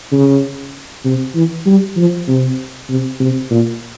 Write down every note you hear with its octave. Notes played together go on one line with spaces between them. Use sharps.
C#3
C3
E3
G3
F3
C3
C3
C3
A#2